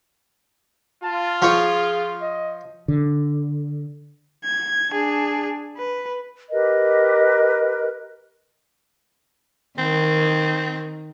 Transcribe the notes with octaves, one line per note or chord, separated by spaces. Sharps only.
F4 A5
F3 G#4 C#5
D#5
D3
G#6
D4 G#4
B4
G4 A#4 B4 D#5
D#3 C4